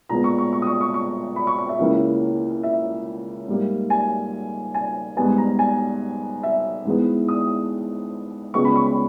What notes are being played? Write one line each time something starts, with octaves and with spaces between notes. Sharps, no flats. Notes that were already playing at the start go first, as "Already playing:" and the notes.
A#2 G#3 B3 A#5
C#6
C#6
C#6
D#6
C#6
C#6
C#6
B5
C#6
C#6
E5
C#2 C#3 E3 A#3
E5
G#2 G3 A#3
G#5
G#5
G#2 G3 B3 G#5
A#5
G#5
E5
G#2 E3 G#3 B3
D#6
C#2 C#3 G#3 B3 C#6
B5
C#6
B5